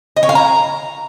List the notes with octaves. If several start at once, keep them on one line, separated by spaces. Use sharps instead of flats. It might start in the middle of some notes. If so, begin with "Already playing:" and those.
D#5
C#5
F5
A#5